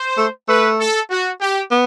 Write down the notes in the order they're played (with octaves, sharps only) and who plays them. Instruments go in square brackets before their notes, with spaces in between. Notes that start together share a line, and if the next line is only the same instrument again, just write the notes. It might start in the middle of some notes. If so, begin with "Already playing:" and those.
Already playing: [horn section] C5
[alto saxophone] A3
[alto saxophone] A3 [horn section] B4
[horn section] A4
F#4
G4
[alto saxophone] B3